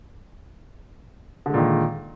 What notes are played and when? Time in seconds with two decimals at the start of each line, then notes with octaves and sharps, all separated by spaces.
1.46 D3
1.50 G#3
1.54 A#2
1.58 D#3